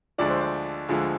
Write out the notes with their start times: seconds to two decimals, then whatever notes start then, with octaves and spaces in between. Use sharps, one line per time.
0.18 D2 D3 F3 G#3 D5
0.30 C5
0.41 D5
0.89 D2 D3 F3 G#3